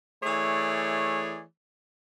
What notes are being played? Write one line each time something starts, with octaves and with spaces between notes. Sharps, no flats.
E3 A3 G#4 C#5 D5